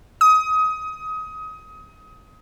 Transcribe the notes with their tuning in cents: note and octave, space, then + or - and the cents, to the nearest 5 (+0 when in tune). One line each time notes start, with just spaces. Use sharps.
D#6 +25